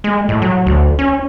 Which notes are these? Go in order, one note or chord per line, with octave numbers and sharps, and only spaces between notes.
G#3
A2
F#3
D2
C#4